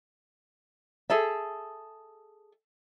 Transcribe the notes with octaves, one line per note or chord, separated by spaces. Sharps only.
G#4 A4 E5